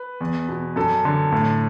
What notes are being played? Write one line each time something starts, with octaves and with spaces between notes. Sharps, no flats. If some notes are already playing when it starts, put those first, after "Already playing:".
Already playing: B4
E2
B2
F#2 A4
D3
A2